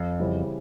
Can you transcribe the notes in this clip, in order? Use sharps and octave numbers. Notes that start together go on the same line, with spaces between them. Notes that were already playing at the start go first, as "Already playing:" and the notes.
Already playing: F2
C#3 E3 G3 C4